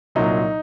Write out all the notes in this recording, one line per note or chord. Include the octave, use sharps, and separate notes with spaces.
C2 A#2 F#3 D#4